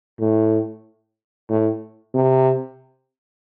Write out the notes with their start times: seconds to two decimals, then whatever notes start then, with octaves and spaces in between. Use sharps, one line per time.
0.20 A2
1.50 A2
2.14 C3